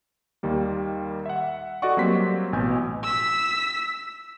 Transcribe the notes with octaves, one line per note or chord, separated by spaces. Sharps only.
D#2 D#3 G3 A#3
E5 F#5
F#4 A4 D5 D#5 F#5 C#6
F#3 G3 A#3 C4 C6 B6
A1 B2 G#5 G6
E6 B6